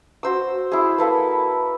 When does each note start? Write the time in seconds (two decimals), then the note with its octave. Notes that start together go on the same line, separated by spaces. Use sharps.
0.23 F#4 C5 E6
0.72 E4 G#4
0.98 A#3 A4 B4